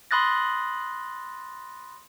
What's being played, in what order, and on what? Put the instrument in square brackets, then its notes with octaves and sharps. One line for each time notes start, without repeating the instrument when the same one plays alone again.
[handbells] B5 C6 D#6 F#6 A6 A#6